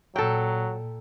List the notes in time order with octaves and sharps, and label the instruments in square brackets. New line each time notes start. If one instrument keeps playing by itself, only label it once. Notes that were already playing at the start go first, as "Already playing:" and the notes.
[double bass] A#2 [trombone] F#3 [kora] A4 G5